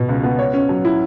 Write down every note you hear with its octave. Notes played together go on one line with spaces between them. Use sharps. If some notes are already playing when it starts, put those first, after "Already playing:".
Already playing: B2
C#2
B3
C#5
C#4
F#3
E4